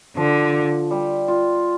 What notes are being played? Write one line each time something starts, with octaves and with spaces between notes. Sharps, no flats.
D3 F3
G3
F4